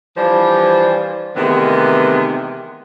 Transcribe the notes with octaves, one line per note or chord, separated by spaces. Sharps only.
E3 F3 G3 D4 C5
C3 D#3 E3 G#3 A3 B3